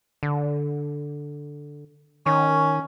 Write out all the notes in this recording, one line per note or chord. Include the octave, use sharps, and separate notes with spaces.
D3
D#3 C#4